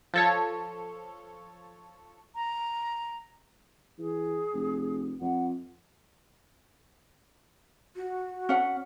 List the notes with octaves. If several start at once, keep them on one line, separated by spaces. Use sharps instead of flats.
F3 A4 C#5
A#5
E3 G#4
F1
F2 F#5
F#4
C#4 F#5